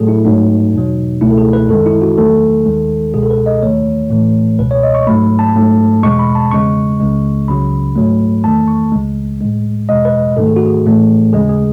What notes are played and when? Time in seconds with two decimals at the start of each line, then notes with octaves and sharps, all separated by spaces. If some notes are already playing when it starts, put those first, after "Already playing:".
Already playing: A2 F#3 A3 G#4 A4
0.08 E4
0.25 G#2 F#3 A3 D#4
0.73 E2 B2 F#3
1.21 C#2 B2 A3 E4
1.30 A4
1.38 G#4
1.53 B4
1.69 F#2 D#3 G#3 A4
1.86 E4
2.02 F#4
2.17 E2 D#3 F#3 A3 A4
2.66 D#2 D#3 G#3
3.14 C#2 B2 G#3 G#4
3.23 A4
3.30 B4
3.46 D#5
3.63 D#2 D#3 A3 C#5
4.10 A2 E3 A3
4.59 C#2 B2 G#3 B4
4.71 C#5
4.83 D#5
4.95 C#6
5.07 G#2 F#3 A3 B5
5.39 A5
5.55 G#2 F#3 A3
6.03 E2 B2 G#3 C#6
6.19 B5
6.35 A5
6.51 E2 C#3 G#3 C#6
7.00 C#2 C#3 G#3
7.48 C#2 C#3 F#3 B5
7.96 G#2 F#3 A3
8.44 E2 D#3 A3 A5
8.68 C#6
8.92 C#2 C#3 G#3
9.40 A2 G#3
9.89 E2 B2 G#3 D#5
10.05 B4
10.36 G#2 D#3 A3 A4
10.47 G#4
10.56 F#4
10.66 G#4
10.86 A2 E3 A3
11.33 D#2 C#3 G#3 G#4
11.49 G#4